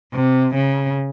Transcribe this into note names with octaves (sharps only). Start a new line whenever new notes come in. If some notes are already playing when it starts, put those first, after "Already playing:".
C3
C#3